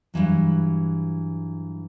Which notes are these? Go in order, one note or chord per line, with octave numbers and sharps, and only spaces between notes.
G2 C3 E3 F#3